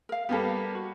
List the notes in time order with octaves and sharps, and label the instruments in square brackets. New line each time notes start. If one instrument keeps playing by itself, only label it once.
[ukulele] A#4 F5
[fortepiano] G3 A#3 B3 [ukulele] G4 A4
[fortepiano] F#4